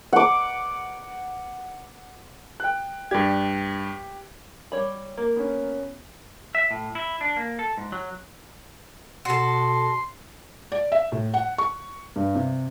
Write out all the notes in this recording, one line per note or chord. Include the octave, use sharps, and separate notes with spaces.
F#5 D6
G5 F#6
G2 G4 D5 G#6
G3 C#5 B5
A#3
B3 C#4
E5
A2
E4
D4
A#3
A4
G#2
F#3
B2 F#4 A4 C6
D5
E5
A2
F#5
C#6
G2
C3